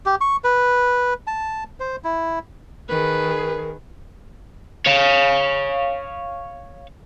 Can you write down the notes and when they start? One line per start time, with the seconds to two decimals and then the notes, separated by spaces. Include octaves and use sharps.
0.06 G4
0.21 C#6
0.44 B4
1.27 A5
1.80 C5
2.04 E4
2.89 D#3 G#4 A#4 B4
4.86 C#5 F5